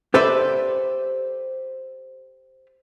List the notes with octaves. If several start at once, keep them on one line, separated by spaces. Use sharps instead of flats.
G4 A4 B4 C5 D5 E5